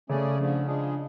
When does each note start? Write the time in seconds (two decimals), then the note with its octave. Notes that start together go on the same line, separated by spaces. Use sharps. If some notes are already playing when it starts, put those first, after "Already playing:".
0.09 C#3 A3 C#4 G#4 D5
0.38 D3 F3 A3
0.66 F3 G#3 D4 G#4